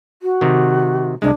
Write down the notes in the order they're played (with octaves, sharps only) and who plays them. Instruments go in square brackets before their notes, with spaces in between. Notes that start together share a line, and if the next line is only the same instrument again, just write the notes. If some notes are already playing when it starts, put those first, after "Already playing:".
[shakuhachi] F#4
[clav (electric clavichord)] C3 D#3
[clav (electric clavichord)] C2 G#3 [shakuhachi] D4